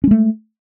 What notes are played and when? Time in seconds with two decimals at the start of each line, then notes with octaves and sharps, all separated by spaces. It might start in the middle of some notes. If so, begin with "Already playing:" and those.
0.04 C#4
0.07 G#3
0.11 A3